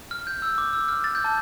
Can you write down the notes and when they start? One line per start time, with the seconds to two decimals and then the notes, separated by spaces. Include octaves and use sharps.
0.11 F6
0.27 G6
0.42 E6
0.58 D6
0.73 E6
0.88 F6
1.04 A6
1.15 G6
1.24 A5